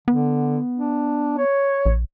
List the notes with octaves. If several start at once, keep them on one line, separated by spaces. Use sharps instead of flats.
D3 B3
D4
C#5
A#1